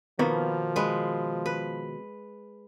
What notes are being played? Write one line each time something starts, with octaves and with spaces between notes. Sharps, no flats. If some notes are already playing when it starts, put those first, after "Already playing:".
B2 D#3 F3 A#3 B3
G#3 B4
B4